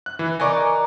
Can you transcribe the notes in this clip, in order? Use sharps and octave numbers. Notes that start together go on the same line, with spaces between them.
F#6
E3
D#4 A#4 D5 G#5 C#6 D6